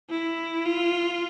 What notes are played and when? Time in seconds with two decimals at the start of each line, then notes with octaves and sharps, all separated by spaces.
0.10 E4
0.66 F4